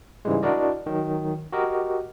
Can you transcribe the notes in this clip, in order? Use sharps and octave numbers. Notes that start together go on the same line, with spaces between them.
G#2 C#3 E3 G3 G#3
D4 E4 F#4 A#4 D5 D#5
D#3 F#3
F#4 G4 A#4 D#5